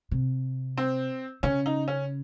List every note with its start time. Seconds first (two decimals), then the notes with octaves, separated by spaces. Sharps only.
0.11 C3
0.78 C4
1.43 C#3 C#4
1.66 D#4
1.88 C#4